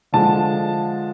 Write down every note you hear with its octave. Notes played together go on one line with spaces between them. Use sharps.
D3 F3 G#3 A5